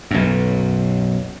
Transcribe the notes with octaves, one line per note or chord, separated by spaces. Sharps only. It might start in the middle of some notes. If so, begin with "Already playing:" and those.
B1 F#2